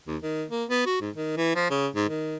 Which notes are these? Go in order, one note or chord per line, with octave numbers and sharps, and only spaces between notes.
D#2
D#3
A#3
B3
F#4
G#2
D#3
E3
F3
C#3
G#2
D#3